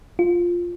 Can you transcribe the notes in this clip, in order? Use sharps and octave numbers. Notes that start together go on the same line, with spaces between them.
F4